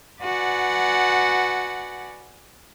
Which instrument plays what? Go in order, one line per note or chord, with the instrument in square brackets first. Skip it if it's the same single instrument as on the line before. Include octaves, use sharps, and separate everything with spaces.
[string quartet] F#4 B4 D5 F#5 G#5